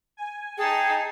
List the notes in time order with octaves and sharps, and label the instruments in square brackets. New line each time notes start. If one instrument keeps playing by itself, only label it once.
[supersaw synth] G#5
[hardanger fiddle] D#4 A5 [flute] G#4 [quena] G5